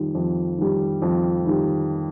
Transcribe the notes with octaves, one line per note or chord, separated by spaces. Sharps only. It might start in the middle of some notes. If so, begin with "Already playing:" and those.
Already playing: F2 D#3 G3
F2
D#3 G3
F2
D#3 G3